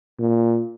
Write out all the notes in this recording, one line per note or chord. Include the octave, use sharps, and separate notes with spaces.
A#2